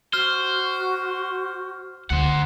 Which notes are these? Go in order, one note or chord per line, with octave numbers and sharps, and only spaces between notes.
F#4 C5 F6
D2 C5 F#5